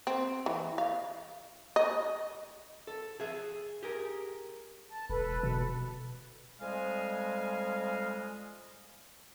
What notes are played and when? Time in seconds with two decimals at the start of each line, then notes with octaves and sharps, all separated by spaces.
0.07 C4
0.46 E3
0.78 F5
1.76 D#5
2.87 A4
3.20 G#4 E5
3.83 G4 G#4 A#4
4.90 A5
5.10 E1 A4 B4
5.43 B2
6.61 F2 G3 G#3 D#5 F5 G#5